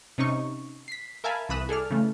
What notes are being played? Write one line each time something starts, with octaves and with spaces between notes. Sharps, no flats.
C3 C#4 D#4 C#6
B6 C7
A#4 E5 F5 G#5 A5 B5
C2 E3 B5 D#6 F#6 E7
G#4 A4 D5 F6
C#3 E3 A3